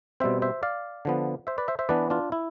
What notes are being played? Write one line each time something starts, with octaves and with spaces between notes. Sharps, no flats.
B2 G3 C4 C5 E5
C5 E5
D5 F5
D3 F3 B3
C5 E5
B4 D5
C5 E5
C5 E5
E3 B3 D4 B4 D5
D4 F4
E4